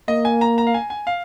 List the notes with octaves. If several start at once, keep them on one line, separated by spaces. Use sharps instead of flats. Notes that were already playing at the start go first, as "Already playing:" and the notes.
A#3 D#5
G#5
A#5
A#5
F5
G#5
G#5
F5